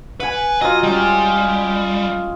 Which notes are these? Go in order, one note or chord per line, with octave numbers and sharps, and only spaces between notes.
B4 F#5 G#5
F#3 F4 D#5
G3 G#3 C#4